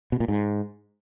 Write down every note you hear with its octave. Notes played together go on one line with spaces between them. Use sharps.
B2
A#2
G#2